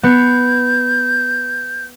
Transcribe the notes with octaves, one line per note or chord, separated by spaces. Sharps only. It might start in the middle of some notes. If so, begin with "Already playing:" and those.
B3 G6 C#7